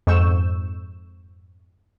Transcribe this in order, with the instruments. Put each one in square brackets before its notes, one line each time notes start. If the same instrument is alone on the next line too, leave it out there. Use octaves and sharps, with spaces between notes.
[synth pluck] F2 G#2 C#6 E6 G6 E7